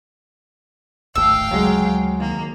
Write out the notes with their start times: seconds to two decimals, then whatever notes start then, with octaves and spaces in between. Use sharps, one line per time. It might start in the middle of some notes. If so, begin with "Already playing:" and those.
1.15 D1 G#1 A3 F5 G5 E6
1.51 D2 C#3 F#3 G#3
2.18 D#3 A#3